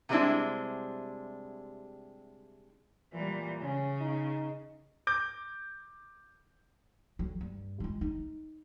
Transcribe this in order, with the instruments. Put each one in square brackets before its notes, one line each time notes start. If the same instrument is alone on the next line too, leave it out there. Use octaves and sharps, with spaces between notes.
[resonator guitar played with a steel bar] C3 G3 G#3 C4 D4 E4
[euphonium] A#2 [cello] E3 G3
[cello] C#3 [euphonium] C#4
[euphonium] D#4
[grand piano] D6 G6
[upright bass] D2 F#3
G2
G#3 F4
D#4